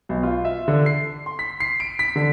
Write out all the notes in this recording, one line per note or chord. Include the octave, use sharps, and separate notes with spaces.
B1
F4
E5
D3
C7
C6
B6
C7
D7
B6
D3